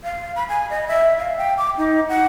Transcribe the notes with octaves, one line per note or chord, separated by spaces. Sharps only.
F5
B5
G#5
D#5
E5
F5
G5
D6
D#4
F#5